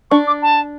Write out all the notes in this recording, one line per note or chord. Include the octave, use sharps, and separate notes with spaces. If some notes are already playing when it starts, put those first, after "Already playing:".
D4 C#6
D6
A5